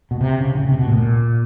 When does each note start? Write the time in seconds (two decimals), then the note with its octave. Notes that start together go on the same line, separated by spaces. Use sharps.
0.11 B2
0.21 C3
0.40 C#3
0.55 D3
0.59 C#3
0.68 C3
0.79 B2
0.88 A2
0.97 A#2